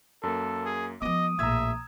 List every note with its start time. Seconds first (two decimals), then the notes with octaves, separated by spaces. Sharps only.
0.23 F#2 A#3 A4
0.65 G#4
1.02 F3 B3 D#5 D6 D#6
1.39 A#1 A2 E5 A#5 E6 G#6